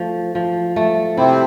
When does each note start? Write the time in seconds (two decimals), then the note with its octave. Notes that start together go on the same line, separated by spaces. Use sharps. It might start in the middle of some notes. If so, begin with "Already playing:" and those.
Already playing: F3 A3
0.35 F3
0.76 A3
1.17 C3 C4 E4